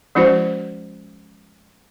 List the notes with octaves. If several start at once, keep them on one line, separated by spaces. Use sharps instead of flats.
F3 G#3 C#4 E4 F#4 C5